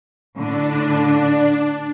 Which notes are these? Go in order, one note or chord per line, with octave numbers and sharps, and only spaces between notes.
A2 D3 D4